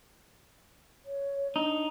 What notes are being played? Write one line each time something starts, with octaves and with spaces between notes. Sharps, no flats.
C#5
D4 D#4